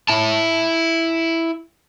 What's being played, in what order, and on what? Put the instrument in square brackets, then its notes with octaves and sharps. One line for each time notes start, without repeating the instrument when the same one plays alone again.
[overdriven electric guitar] E4 A5